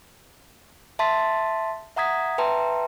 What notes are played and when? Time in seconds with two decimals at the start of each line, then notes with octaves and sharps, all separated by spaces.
0.99 E5 A5 C6 A6 B6
1.97 E5 F#5 A#5 D#6 G#6 B6
2.38 B4 E5 G5 A5 A#5 C6